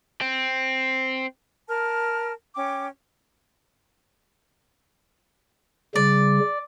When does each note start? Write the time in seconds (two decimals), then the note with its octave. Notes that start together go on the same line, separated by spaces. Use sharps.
0.21 C4
1.68 A#4 A5 F6
2.55 C#4 G5 D6
5.95 C#3 G3 D5